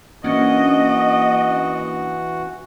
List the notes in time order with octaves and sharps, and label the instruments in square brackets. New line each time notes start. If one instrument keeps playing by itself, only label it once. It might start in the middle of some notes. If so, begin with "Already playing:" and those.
[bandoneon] E3 F#4 F#5 [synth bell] A#3 C#4 D4 [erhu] D#5